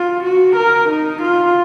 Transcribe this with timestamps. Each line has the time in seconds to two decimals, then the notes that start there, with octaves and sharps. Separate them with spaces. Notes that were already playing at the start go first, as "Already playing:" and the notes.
Already playing: F4
0.24 F#4
0.57 A#4
0.90 D#4
1.23 F4